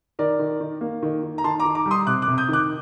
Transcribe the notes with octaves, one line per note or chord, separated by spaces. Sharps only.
D#3 A#4 D5
D#3
D#3
A#3
D#3
D#3
A#5
D#3 A5 C6
A#5 D6
D#3
A#5 D6
G3
C6 D#6
C3 D6 F#6
D6 F#6
C3
D#6 G6
D#3 D6 F#6